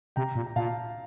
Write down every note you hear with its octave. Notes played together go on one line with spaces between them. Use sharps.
C3 G5 A#5
A#2
A#5
A#2 F5 A5